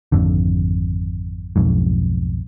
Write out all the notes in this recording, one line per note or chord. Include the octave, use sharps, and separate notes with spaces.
G#1 F2 D3
B1 F2 G#2